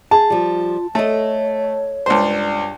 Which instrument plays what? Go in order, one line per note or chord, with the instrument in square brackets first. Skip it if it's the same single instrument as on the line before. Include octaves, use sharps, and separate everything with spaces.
[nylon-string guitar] G#4 [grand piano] A5
[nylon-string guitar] F3 G3 [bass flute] F4
[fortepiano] A3 [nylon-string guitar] A4 D#5 [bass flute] C#5
[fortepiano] C#2 C5 [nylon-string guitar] G2 D4